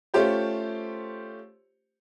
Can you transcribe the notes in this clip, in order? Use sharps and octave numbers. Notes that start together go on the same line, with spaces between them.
A3 C#4 F4 G4 C5